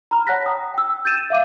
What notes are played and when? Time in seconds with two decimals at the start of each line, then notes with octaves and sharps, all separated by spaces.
0.11 A#5 B5 F6
0.27 C#5 F#5 A5 F#6 A#6 B6
0.46 G5 A#5 D#6
0.74 G5 E6
1.05 G6 A6 D#7 E7
1.30 E5 F5 D6 D#7